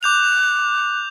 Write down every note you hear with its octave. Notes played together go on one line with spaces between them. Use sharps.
D6 F#6 G6 F7